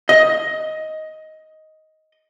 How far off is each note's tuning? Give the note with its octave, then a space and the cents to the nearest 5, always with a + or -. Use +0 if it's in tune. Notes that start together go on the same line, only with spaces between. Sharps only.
D#5 +10